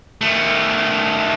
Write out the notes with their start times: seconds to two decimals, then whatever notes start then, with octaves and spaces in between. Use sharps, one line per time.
0.21 D#3 A3